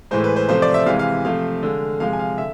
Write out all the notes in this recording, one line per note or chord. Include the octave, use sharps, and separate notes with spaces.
A2 E3 G#3 C5
B4
C5
C3 F3 A3 C5
D5
E5
C3 E3 G#3 F5
F5
C3 F3 A3 F5
D3 G#3
C3 F3 G#3 F5
G#5
F5
D3 E5